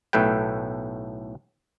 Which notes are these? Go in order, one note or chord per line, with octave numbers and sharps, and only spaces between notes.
B1 A2 A3 B4 G5